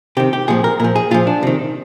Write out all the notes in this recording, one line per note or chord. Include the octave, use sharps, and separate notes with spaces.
C3 D#3 G4
G4
A#2 F3 G#4
A#4
A#2 F3 A#4
G#4
A#2 F3 F4
D4
C3 D#3